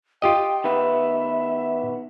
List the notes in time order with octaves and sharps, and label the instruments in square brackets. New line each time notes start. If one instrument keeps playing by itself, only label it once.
[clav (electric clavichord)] F4 G4 D#5 [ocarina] G5
[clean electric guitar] D#3 B3 B4 [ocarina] E5